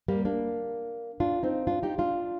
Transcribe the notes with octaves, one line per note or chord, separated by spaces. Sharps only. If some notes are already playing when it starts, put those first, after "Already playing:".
G3 A#3
A#3 D4
D4 F4
C4 D#4
D4 F4
D#4 G4
D4 F4